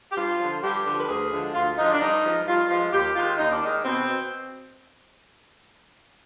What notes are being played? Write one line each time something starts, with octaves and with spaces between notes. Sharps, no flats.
G4
G2 F4
D3 F3
G2 G4
D3 F3
B4
D2 G#4
D3 F3 G#3
D2 F4
D3 F3 G#3 D#4
D4
G2 D#4
F3 G#3
G2 F4
F3 G#3 F4
D#2 G4
D#3 G#3 F4
D#2 D#4
D4
D#3 G#3 D#4
B2 C4